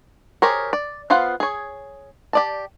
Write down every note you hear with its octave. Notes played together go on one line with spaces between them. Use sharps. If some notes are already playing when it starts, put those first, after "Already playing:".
G4 G#4 A#4 C5 C#5
D5
B3 F4 C5 F5 F#5
G#4 C#5
G4 D5 A5